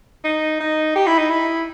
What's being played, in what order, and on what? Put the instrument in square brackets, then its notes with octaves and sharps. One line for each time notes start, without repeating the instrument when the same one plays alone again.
[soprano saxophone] D#4
D#4
G4
E4
D#4
E4